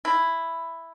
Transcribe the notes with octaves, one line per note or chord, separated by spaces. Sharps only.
E4